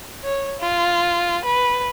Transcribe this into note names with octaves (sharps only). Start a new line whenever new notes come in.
C#5
F4
B4